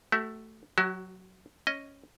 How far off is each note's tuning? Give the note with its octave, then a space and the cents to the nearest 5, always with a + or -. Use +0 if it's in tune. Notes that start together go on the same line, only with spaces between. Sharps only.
A3 +0 F#4 +40 E5 +0
F#3 +0 F#4 +40 E5 +10
C#4 +0 D#5 +0